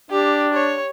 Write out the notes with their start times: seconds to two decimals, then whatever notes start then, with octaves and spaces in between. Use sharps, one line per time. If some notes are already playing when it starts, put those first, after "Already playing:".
0.10 D4 G4
0.54 C#5